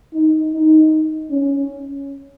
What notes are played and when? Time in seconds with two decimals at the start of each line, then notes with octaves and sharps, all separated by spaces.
0.14 D#4
0.53 D#4
1.31 C#4